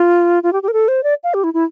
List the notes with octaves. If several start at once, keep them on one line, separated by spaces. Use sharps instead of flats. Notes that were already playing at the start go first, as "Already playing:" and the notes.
Already playing: F4
F4
G4
G4
A#4
A4
C5
D5
F5
G4
E4
E4